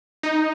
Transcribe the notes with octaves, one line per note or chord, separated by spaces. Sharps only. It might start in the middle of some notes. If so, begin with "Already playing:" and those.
D#4